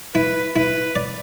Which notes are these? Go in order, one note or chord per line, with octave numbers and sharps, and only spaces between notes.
E4 B4
E4 B4
D5